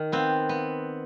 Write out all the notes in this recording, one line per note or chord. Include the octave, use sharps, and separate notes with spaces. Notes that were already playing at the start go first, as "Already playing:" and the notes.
Already playing: D#3
B3 C4
B3